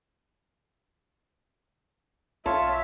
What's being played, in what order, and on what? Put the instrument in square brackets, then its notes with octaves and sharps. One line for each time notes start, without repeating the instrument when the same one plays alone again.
[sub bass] B1 [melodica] F4 C#5 [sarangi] E5 [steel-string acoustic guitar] A5